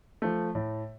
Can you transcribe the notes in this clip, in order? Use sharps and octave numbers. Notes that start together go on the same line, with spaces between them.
F3 A3
A2